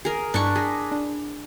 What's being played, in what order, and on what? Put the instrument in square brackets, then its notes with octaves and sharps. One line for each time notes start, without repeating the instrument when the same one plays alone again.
[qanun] G#4 A#4
[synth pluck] G2 [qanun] D4 E4 C#6
[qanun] G#4 [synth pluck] A#6 B6
[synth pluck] D4